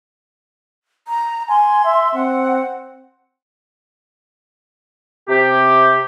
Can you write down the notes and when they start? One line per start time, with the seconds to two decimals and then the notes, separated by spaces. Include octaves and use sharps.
1.08 A#5
1.49 G#5 C6
1.85 E5
2.15 C4 F#5
5.29 C3 G4